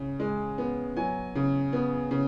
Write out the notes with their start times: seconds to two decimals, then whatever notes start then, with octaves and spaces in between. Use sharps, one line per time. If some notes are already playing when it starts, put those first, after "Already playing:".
Already playing: C#3
0.20 G#3
0.58 B3
0.97 F#3 G#5
1.35 C#3
1.73 B3
2.11 C#3